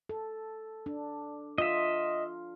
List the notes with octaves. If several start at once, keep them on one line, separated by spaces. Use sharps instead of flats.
A4
D4
F4 D#5 E5